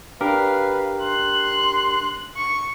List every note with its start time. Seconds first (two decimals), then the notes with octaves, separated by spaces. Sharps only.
0.21 D4 G4 A#4 B4 F5
1.01 C6 F#6
2.37 C#6